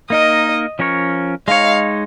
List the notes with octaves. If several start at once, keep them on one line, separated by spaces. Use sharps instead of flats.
A#3 D#4 A#4 D#5
F3 C#4 A#4 C#5
G#3 D#4 C#5 F5